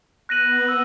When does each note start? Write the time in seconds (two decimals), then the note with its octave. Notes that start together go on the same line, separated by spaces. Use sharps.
0.29 B3 F#6 A#6 D#7 F#7
0.68 E6